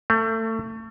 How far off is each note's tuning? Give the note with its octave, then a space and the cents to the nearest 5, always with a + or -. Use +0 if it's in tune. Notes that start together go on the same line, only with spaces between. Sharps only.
A3 +30